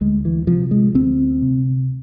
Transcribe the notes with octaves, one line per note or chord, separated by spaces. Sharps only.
D2 G#3
E3
C3 F3
G#3
D2 C4
C3